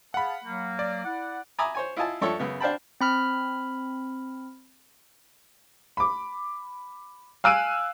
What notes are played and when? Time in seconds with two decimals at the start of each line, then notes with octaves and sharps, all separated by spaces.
0.14 G#4 F5 F#5 A5 B5
0.44 F#3 A#3
0.79 D5
1.04 E4 F#5
1.58 E5 G#5 A#5 B5 D6 D#6
1.75 C5 C#5 G#5
1.96 E4 F4 D#5 G#5 A5
2.21 G2 F3 D4 A4 C#5 E5
2.39 F#2 C#3 B3
2.60 D4 C5 F5 G5 A5 B5
3.01 C4 B5 F6
5.97 B5 D6
7.44 F5 G#5 E6 F#6 D7 D#7